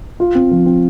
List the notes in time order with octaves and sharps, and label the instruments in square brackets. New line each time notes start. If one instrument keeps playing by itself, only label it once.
[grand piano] F4
C4
F3
C4